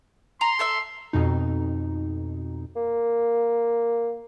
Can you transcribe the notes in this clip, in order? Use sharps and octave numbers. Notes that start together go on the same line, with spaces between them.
A#5 C6
A4 E5 E6
F2 B2 D#4
A#3